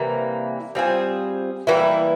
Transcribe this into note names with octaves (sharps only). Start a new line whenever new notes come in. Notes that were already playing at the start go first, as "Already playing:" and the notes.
Already playing: C3 E3 G3 A#3
G3 C4 F4 G#4
E3 G3 A#3 E4